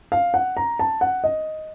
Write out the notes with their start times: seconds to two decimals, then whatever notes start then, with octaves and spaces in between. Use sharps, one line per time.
0.12 F5
0.34 F#5
0.57 A#5
0.79 A5
1.01 F#5
1.24 D#5